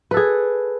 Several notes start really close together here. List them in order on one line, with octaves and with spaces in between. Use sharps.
B4 A4 G#4